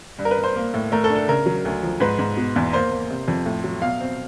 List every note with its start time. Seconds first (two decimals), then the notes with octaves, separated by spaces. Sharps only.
0.19 G2
0.25 A#4
0.31 B4
0.38 G2
0.44 C5
0.56 A#3
0.74 A2
0.92 A3 A#4
1.04 A4
1.10 D4
1.16 A4
1.28 C#3 A#4
1.46 F#3
1.65 D2
1.83 F3
2.00 G#2 B4
2.19 G#2
2.37 B2
2.56 E2
2.73 A#3 C5
2.91 A#3
3.10 C3
3.28 F2
3.45 A2
3.64 F#3
3.82 B2 F5
4.01 C4